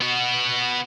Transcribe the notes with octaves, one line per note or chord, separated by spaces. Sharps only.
B3 F#4